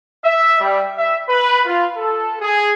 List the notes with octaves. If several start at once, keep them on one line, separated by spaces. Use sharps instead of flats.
E5
G3
E5
B4
F4
A4
G#4